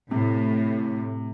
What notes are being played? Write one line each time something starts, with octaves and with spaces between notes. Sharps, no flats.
A2 C3